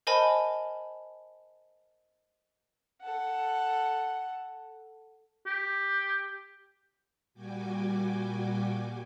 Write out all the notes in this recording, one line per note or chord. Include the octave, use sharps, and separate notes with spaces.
A#4 C5 D#5 G#5 A5 B5
A4 F#5
G4
A#2 G3 F#4 G5 G#5 D6